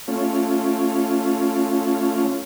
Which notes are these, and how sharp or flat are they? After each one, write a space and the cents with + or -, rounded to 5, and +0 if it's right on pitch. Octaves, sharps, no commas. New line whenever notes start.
A3 +0 C#4 +0 F4 +0